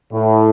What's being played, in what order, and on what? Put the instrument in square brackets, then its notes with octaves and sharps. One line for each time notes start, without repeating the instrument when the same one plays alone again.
[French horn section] A2